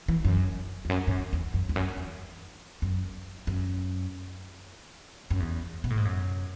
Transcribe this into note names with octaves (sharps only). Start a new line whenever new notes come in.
E3
F#2
E2
F#2
G#2
F#2
E2
F#2
E2
F#2
E2
F#2
F#2
F#2
E2
B2
A2
G#2
F#2